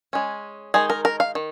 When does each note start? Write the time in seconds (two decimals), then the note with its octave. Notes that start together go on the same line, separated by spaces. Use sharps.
0.13 G#3 C#4
0.74 D#3 G#3 D#4 G#4
0.90 A#4
1.05 A#4
1.20 F5
1.35 D#3